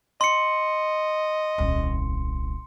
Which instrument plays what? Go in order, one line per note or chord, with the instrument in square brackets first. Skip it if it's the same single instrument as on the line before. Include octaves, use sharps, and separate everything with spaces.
[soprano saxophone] D#5 [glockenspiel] C6 C#7
[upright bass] D#1 C2